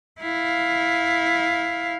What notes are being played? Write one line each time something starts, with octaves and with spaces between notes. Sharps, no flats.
E4 F5